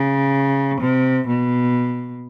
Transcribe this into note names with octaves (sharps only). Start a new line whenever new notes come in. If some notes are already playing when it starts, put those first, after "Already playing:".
Already playing: C#3
C3
B2